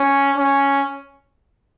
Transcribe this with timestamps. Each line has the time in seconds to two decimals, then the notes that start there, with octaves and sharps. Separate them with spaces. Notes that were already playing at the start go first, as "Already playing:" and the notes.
Already playing: C#4
0.37 C#4